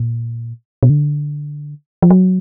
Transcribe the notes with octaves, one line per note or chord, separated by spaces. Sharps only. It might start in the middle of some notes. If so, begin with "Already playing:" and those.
Already playing: A#2
B2
D3
F3
F#3